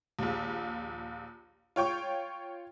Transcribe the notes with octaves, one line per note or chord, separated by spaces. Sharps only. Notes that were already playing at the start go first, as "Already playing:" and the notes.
A#1 D#2
F4 C#5 G5 C#6